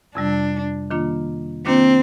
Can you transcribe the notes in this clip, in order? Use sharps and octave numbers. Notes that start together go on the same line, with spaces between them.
F2 C3 G3 D4
D#3 A#3 D4 F4
D#3 A#3 C4 D4 F4